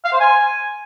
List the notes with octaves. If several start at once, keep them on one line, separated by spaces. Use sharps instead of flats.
F5
C5
G#5